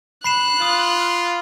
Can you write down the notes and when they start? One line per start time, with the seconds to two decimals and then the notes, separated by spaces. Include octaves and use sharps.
0.24 B5 F#6 C7 E7
0.62 F4 D#6